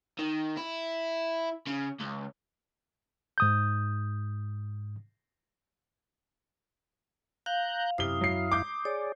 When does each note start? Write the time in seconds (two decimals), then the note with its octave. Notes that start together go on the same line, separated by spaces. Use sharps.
0.19 D#3
0.57 E4
1.67 C#3
2.00 C#2
3.38 G#2 D#6 G6
7.46 F5 A#5 F#6 G6
7.98 F#2 C3 E4 F5 D#6 G7
8.21 F#3 C7
8.52 D6 G6
8.85 G#4 C#5 D5